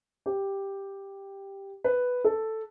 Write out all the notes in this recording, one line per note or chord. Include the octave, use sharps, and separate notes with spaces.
G4
B4
A4